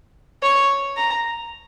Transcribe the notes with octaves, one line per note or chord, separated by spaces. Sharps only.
C#5
A#5